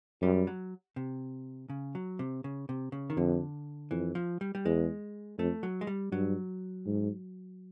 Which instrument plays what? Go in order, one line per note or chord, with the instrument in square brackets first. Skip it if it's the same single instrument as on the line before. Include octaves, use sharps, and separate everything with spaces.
[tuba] F#2 [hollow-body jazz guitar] G3
[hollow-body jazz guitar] F#3
C3
C#3
F#3
C3
C#3
C3
C#3
D#3
[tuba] F2 [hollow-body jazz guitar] D3
[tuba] F2 [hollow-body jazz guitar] E3
[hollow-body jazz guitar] F3
G3
G3
[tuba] E2 [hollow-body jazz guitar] G#3
[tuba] F2 [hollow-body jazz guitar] A3
[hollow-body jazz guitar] F#3
G#3
G3
[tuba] G2 [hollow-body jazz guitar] F#3
[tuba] G#2